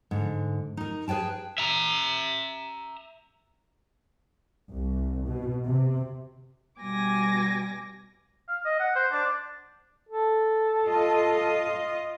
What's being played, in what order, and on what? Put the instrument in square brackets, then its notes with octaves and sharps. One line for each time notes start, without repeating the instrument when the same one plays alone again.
[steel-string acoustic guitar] G#2 D3
D#4 A#4
G#4 B4 D5 G5 A5
[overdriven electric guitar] E5 A#5
[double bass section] C2
B2
C3
[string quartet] B2 G3 G#5 D6 A#6
[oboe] F5
D#5
F#5
C5
D4
[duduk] A4
[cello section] F4 D#5